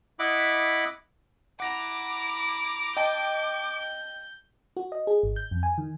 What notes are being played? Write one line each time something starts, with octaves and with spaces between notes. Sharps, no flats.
E4 D#5 E5 F#5 B5 D6
E4 F#5 A#5 D6 A#6
D#5 G5 A5 G6
F#4
D#5
G#4
G#1
G6
F2
G#5
D#3